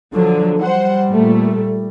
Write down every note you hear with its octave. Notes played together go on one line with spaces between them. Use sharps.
D3 F3 F#3
G3 C5 F#5
A#2 A3